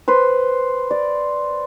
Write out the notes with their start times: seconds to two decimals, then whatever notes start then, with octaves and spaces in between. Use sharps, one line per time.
0.08 B4 C5
0.91 D5